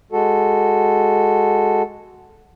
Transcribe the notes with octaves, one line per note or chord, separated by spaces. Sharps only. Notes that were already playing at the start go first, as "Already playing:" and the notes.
G#3 F#4 A4